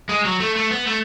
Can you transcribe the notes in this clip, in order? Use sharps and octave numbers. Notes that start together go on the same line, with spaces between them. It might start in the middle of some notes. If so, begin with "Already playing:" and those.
G#3
F#3
A3
A3
B3
A3